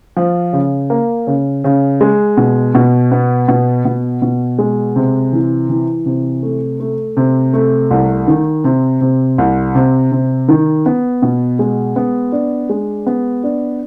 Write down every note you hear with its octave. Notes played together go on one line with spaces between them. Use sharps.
F3
C#3
A#3
C#3
C#3
G#3
B2
B2
B3
B2
B2
B2
G#3
C3
E3
E3
C3
A3
A3
C3
A3
C2
D#3
C3
C3
C2
C3
C3
D#3
B3
B2
G#3
B3
D4
G#3
B3
D4